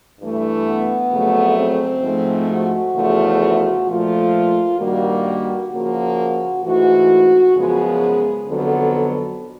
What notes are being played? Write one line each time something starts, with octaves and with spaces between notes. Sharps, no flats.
G2 E3 A3
B3
F2 C#3 F#3 A3
C4
G#2 F3 A3
F#4
E2 C#3 F3 A3
F#4
A#2 F3 A3 F4
G2 D#3 G3 A#3 F#4
C#3 F3 A#3 F#4
G#2 E3 A3 F#4
F#2 C#3 F3 G#3 B3 G#4
F2 D3 F#3 B3 A4